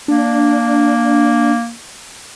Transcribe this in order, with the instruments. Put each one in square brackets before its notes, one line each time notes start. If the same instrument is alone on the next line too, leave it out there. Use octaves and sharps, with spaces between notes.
[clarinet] A#3 [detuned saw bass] D4